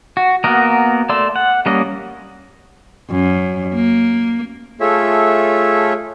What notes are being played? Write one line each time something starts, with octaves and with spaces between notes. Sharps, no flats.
F#4
A#3 B3 F#4 A#4 D#5
A3 D5 C6 E6
F#5
G3 A#3 C#4 D#5
F#2
A#3
A3 F4 G#4 A4 C#5 E5